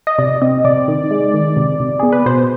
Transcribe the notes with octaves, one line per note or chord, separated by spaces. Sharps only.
D#5
C3 D5
C4 D#5
C3 D5
D#3
G#3
D#3
C3
C3
B3 G#4
B4
B2 C5